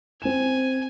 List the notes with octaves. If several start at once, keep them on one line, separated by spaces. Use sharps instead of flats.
C4 G#5 E7